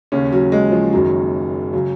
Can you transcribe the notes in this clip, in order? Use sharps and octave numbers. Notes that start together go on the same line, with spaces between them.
D#2 C#3 C#4
F#3
G#3
F3
F#1 F#2 D#3 F#3
C#3 F#3